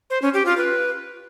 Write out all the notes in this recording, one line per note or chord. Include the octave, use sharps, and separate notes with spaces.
C5
C#4
G4
F4
B4